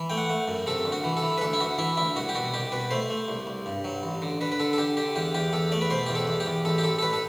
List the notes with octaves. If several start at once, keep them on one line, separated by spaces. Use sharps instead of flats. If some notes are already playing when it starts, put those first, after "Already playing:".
Already playing: E3
A3 G5
F#5
A3
F#2
C3 A4
D2
F#4
E3
A4
E3
B4
D2 A4
E4
D2 F#4
E3 E4
D2 E4
C2 F#4
G4
B2 F#4
C2 G4
B2 B4
A3 C5
A3
C2
C2
G2
F#3
A1
D3
D3 B4
B4
D3 A4
A4
D3 G4
D3 G4
E2 G4
E2 G4
E2 A4
A3 D5
B4
B2 C5
E2 G4
A4
E2
G4
E2
A1 A4
G4
A1 A4
A4
A1 B4
A4